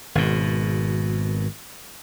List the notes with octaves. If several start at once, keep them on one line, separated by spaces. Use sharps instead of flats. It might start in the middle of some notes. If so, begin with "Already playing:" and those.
G#1 B2